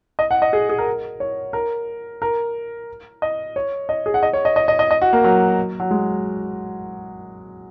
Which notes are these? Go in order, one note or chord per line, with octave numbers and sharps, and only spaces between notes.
D#5
F#5
D#5
G#4
G#4
A#4
C#5
A#4
A#4
D#5
C#5
D#5
G#4
F#5
D#5
C#5
D#5
D#5
D#5
D#5
D#5
F#4
A#3
F#3
F#3
G#3